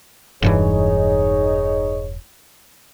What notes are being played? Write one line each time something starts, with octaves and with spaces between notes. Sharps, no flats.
E1 G2 E3 D#4 G#4 C#5